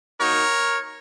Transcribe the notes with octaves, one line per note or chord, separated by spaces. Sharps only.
A#3 D#4 F#4 A#4 C#5